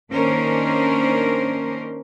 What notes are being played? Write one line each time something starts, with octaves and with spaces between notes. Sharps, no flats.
D#3 A#3 C#4 D4 A#4 C5